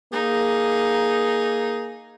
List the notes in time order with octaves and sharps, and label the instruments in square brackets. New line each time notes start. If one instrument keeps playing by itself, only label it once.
[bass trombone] A#3 [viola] D#4 [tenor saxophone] G#4